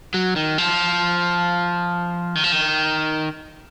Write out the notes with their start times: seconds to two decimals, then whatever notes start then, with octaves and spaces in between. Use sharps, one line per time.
0.14 F#3
0.36 D#3
0.58 F3
2.35 D#3
2.44 F3
2.52 D#3